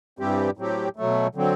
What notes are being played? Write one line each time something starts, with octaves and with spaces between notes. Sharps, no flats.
G2 E3 G3 C4 G4
A2 F#3 C4 G4
B2 F#3 A3
D3 F#3 C4